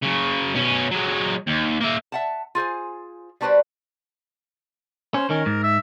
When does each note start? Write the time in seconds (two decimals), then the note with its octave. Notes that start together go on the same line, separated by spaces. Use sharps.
0.03 C#3 F#3
0.55 B2 C#4
0.91 F#3 G#3
1.47 D#2
1.81 A#3 E5
2.12 E5 F#5 A5
2.55 F4 G#4 C5 G#5
3.41 G3 D4 F#4 B4 C5 D5
5.14 C#4 C5
5.30 D#3 C#4 A#4
5.46 G#2
5.63 E5